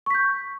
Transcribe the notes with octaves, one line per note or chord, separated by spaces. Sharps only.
C#6 G6 B6